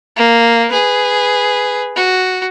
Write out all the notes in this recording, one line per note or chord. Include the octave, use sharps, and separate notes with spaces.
A#3
G#4 B4
F#4